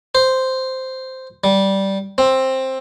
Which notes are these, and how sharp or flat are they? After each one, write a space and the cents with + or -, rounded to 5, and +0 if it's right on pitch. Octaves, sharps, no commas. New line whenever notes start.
C5 -5
G3 -10
C4 +10